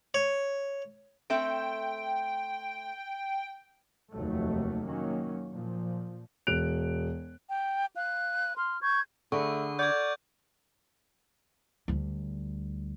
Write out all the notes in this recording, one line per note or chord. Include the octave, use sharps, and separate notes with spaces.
C#5
A3 C4 E5 G5
F1 D#2 D#3 F#3 A3
D#3 F#3 A#3 C#4
A#2 F3
E1 F#6 D7 F7
G5
F5 F#6
C6 F6
C#6 G6 G#6
D3 A3 G#4 A4 B5 C#6
D5 F#5 D6 F6 G6 G#6
D2 G3